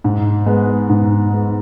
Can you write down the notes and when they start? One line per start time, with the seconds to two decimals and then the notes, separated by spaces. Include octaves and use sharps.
0.04 G#2
0.46 G#3 B3
0.89 G#2
1.31 G#3 B3